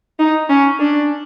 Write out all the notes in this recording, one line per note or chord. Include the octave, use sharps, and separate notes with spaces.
D#4
C#4
D4